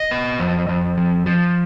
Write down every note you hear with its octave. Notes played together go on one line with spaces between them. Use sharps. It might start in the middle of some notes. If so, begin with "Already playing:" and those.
Already playing: D#5
B3
F2
F2
F3
F3